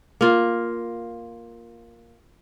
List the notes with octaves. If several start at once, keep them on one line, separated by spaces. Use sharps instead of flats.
A#3 F4